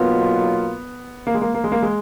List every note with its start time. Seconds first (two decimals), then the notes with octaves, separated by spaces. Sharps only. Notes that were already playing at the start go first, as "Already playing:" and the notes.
Already playing: B1 B2 F#3 A#3 B3 F4
1.27 A#3
1.34 G#3
1.42 A#3
1.54 A#3
1.64 G#3
1.72 A#3
1.83 G#3